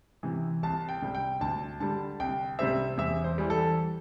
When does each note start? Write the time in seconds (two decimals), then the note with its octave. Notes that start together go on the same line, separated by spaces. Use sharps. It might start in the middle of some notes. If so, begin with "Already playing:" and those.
0.23 C3 E3
0.63 C2 A5
0.89 G5
1.02 C3 G3
1.15 G5
1.41 D2 A5
1.80 D3 G3 A5
2.20 C2 G5
2.59 C3 G3 C4 E5
2.98 E2 E5
3.24 C5
3.38 E3 G3
3.50 A4